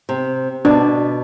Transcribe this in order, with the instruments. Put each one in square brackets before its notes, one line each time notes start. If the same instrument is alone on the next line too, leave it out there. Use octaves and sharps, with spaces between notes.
[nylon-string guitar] C3
[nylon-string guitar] B2 [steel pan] D4